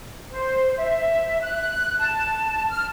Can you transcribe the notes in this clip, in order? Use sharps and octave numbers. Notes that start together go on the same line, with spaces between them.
C5
E5
F#6
A5
F6